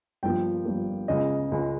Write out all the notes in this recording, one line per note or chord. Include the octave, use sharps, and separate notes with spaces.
G1 G2 F3 A#3 G5
G1 G2 F3 A#3
C#2 C#3 G#3 D#5
C#2 C#3 G#3